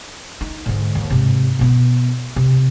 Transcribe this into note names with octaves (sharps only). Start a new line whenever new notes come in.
D#4
G#2 D3
D#2
G#2 C3
B2 B3
C3